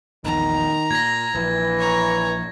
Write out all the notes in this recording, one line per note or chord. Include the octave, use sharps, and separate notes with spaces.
A#1 E2 D#3 A#5
A#2 G#6 A#6
A#1 E3
C#5 A#5